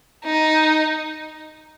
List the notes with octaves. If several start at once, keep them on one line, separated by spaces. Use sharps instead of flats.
D#4